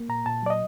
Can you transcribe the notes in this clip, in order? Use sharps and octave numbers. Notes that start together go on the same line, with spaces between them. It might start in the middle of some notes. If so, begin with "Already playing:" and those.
Already playing: A#3
A#2 A#5
A#2 A5
F#3 D5
D#5